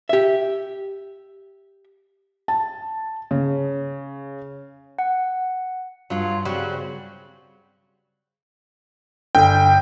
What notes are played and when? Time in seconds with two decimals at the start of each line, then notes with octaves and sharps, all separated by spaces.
0.09 G4 E5
2.48 A5
3.31 C#3
4.99 F#5
6.10 G2 F#3 F4
6.45 C#3 F#3 G3 C4 F#4
9.35 G1 G5